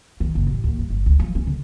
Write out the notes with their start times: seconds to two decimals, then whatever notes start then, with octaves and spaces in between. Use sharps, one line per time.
0.20 D#3
0.35 F#1
0.47 A1
0.64 D#2
0.79 G2
0.90 G1
1.06 D2
1.20 F3
1.35 C#4
1.47 D3